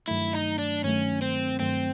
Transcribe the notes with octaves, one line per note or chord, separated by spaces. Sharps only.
G2 D#3 F#3 A3 E4
D#4
D4
G2 D#3 F#3 A3 C#4
C4
G2 D#3 F#3 A3 C4